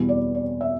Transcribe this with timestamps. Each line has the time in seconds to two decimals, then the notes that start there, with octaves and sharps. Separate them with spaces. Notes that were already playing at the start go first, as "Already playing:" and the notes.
Already playing: E2 B2 G3 B3
0.09 D5
0.35 D5
0.61 E5